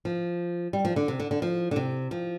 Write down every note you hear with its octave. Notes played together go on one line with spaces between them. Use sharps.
F3
G3
F3
D3
C3
D3
D3
F3
D3
C3
F3